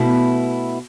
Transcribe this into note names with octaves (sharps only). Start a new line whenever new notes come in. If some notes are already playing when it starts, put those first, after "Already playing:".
Already playing: B2 A3 E4